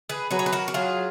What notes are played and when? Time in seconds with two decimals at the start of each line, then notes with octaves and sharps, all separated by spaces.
0.09 G#4 B4
0.31 F#3 G#4 B4
0.39 C#5
0.46 B4
0.53 F#4 A#4
0.68 F#4
0.74 F#3 F4 G#4